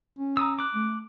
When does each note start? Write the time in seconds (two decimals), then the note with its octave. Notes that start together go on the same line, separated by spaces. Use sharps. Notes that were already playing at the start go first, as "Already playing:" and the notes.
0.19 C#4
0.37 A#5 D#6 E6
0.59 D6 F#6
0.75 A3